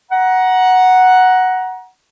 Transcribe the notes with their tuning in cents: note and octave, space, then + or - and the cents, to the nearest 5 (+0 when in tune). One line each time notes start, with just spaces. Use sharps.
F#5 +0 A#5 +20